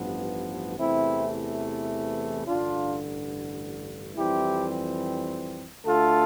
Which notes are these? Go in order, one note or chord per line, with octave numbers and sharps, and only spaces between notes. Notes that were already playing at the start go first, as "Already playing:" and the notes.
Already playing: A1 G2 F3 B3
E2 C3 E3 A3 C4 E4
A1 G2 D3 D4 F4
F2 E3 G3 C4 E4 G4
D2 D3 A3 F4 A4